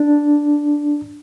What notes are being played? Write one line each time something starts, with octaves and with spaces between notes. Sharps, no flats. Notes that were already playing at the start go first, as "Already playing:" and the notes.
Already playing: D4